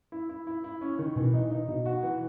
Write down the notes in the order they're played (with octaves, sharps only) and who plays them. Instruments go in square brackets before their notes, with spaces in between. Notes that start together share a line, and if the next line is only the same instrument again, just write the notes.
[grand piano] E4
E4
E4
E4
C#4
D#3
[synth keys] B2 [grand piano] E3
[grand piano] D#4
D#4
[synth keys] B2 [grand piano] D#4
[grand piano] F#4
E3